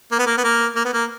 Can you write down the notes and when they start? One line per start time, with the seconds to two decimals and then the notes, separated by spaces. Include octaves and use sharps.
0.12 A#3
0.19 B3
0.26 A#3
0.38 B3
0.44 A#3
0.76 A#3
0.85 B3
0.93 A#3